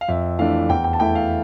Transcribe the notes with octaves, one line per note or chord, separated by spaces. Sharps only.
F5
F2 E5
E3 A3 D4 F5
E2 G5
G5
A5
E3 A3 E4 G5
F5